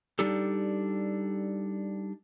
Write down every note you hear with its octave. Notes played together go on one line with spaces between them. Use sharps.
G3 D4 D#4 G4 A4